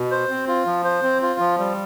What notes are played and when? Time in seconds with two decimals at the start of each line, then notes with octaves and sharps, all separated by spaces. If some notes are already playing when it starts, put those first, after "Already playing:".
Already playing: B2
0.11 C5
0.30 C4
0.48 F4
0.66 F3
0.84 C5
1.03 C4
1.22 F4
1.40 F3
1.58 G3